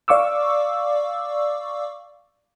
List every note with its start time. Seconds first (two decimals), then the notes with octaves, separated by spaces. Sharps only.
0.08 D5 F5 C#6 D6 E6